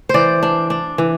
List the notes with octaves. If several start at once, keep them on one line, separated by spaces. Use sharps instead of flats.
E3 C5 D5
D4
D4
E3